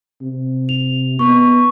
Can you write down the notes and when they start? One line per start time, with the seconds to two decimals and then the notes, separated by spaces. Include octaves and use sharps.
0.21 C3
0.69 F7
1.19 B3 C#6